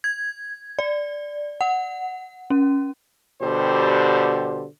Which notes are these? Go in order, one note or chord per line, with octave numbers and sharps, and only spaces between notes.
G#6
D5
F#5
C#4
B2 D3 G3 G4 C5